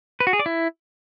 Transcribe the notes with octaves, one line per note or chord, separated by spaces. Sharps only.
B4
F#4
G#4
D5
E4